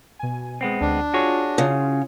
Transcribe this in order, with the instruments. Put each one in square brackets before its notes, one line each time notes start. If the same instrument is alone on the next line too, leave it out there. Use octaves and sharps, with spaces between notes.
[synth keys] B2 G#5
[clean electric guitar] G#3 B3 C4
[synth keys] D2 [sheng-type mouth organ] D4
[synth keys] F4 [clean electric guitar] F#4 G#4 C#5
[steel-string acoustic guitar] C#3 [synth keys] F4